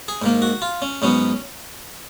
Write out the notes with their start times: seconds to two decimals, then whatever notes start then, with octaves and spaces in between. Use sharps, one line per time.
0.08 G#4
0.22 G#2 D#3 A#3
0.42 F#4
0.62 F4
0.82 C#4
1.02 G#2 F#3 B3 C#4